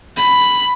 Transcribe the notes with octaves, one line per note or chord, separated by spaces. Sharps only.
B5